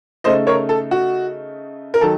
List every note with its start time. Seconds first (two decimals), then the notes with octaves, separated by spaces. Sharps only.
0.24 C#3 A3 D#4 C5 D#5
0.47 A#4 C#5
0.69 A4
0.91 F#4
1.94 A#4
2.01 D#3 F#3 A4